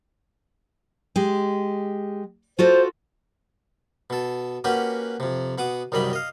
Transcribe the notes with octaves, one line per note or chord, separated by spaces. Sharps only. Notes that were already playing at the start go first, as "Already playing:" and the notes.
G#3 G4
F4 F#4 A4 C5
B2 A4
A#3 C#4 F#4 G4 B4 F#5
F2 C3
B2 F#5 D6 D#6
C2 F#2 D#3 G3 D#5 B5
D#5 F5